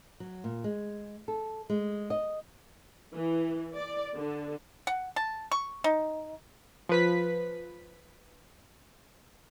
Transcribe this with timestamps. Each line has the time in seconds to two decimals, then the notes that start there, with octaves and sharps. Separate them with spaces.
0.20 F#3
0.44 A#2
0.64 G#3
1.28 A4
1.70 G#3
2.10 D#5
3.15 E3
3.75 D5
4.16 D3
4.87 F#5
5.16 A5
5.51 C#6
5.84 D#4
6.89 F3 B4 B6